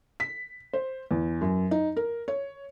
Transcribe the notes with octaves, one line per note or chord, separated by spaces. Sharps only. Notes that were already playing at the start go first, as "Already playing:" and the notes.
B6
C5
E2
F#2
D#4
A#4
C#5